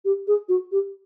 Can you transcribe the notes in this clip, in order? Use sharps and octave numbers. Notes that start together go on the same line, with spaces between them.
G4
G#4
F#4
G4